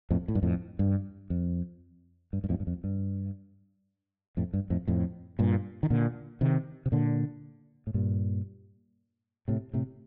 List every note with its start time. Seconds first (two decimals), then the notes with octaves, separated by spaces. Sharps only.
0.10 F2 A2
0.28 A2
0.35 G2
0.43 F2 A2
0.79 G2
1.30 F2
2.33 G2
2.44 G2
2.49 F2 A2
2.60 G2
2.67 F2
2.84 G2
4.37 F2 A2
4.53 G2
4.70 F2 A2
4.88 F2 A2
5.39 G2 A#2
5.83 D#3
5.90 A#2 D3
6.41 C3 D#3
6.86 C3
6.92 A#2 D3
7.87 A2
7.94 G2 A#2
9.48 A2 C3
9.73 A2 C3